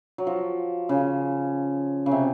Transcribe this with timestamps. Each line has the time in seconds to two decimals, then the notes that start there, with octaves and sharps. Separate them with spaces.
0.18 F#3
0.27 F3
0.89 C#3
2.06 C#3
2.11 C3